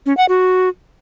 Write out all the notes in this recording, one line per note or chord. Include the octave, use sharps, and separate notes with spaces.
C#4
F#5
F#4